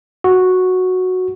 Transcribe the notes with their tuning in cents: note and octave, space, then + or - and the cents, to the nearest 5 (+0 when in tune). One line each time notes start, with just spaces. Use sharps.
F#4 -5